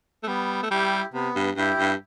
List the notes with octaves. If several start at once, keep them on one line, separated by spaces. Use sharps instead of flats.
A3
G3 B3
A3
G3 E4 G4
C3 B3
G2
G2 E4 G4
G2